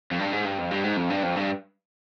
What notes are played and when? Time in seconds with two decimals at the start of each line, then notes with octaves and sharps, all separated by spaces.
0.12 F2
0.20 G2
0.33 G#2
0.45 G2
0.58 F2
0.71 G2
0.84 G#2
0.97 F2
1.10 G2
1.23 F2
1.36 G2